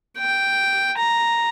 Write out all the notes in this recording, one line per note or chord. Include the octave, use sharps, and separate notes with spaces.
G5
A#5